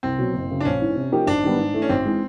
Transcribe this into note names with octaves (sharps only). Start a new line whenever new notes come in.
C2 C4
B2 F#3
F#1
F#2 C#3
D4
A#1 C#4
G#2 E3
C3
F3 A#3 D#4 G4
G#1 D4
G#2 D#3 G3 B3
G#2
E3 A3
C#4
G#1 C4
E3 G#3